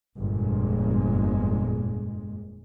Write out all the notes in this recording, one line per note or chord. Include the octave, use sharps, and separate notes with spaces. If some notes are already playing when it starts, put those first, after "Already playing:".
G1 F2 A#2 G#3